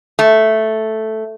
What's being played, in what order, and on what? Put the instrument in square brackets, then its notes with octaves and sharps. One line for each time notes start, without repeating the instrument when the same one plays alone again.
[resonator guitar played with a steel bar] A3